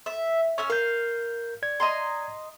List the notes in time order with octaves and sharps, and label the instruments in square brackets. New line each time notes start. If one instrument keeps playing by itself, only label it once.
[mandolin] E5
[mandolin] C#4 E5 F6 [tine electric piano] C#6
[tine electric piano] A#4 G6 [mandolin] F5
[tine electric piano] D5 G#6
[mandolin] D#5 A#5 C6